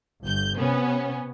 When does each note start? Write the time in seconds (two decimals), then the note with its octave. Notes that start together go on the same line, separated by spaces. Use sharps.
0.23 G1 G6
0.57 C3 B3 C#4